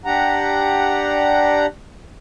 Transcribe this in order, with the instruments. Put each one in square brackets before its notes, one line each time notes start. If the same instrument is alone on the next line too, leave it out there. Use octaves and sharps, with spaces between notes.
[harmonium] D4 G4 F#5 A#5